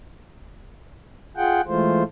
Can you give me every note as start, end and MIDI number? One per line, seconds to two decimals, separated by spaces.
1.37 1.61 65
1.37 1.61 68
1.37 1.61 78
1.37 1.61 79
1.67 2.03 52
1.67 2.03 56
1.67 2.03 57
1.67 2.03 65
1.67 2.03 72